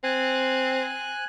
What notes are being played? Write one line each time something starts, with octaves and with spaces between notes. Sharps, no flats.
C4 G#5 F#6